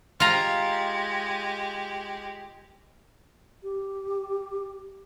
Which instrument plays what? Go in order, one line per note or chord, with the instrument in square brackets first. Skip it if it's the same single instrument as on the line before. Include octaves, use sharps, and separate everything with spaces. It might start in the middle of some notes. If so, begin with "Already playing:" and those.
[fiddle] G#3 G4 [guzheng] F4 A#5
[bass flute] G4